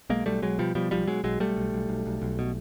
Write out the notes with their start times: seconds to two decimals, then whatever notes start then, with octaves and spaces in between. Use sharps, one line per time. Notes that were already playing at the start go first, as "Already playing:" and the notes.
0.10 B1 G#3 A#3
0.26 B1 G3 A3
0.42 B1 F#3 G#3
0.59 B2 F3 G3
0.75 B2 F3 G3
0.91 B1 F3 G3
1.07 B1 F#3 G#3
1.24 B1 F#3 G#3
1.40 B1 G3 A3
1.57 B1
1.73 B1
1.89 B1
2.06 B1
2.22 B1
2.39 B2